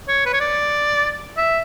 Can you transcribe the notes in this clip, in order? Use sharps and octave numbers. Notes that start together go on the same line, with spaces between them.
C#5
B4
C#5
D5
E5